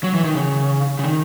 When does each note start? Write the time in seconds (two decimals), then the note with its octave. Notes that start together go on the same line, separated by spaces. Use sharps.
0.04 F#3
0.14 E3
0.24 D#3
0.35 C#3
0.99 C#3
1.04 D#3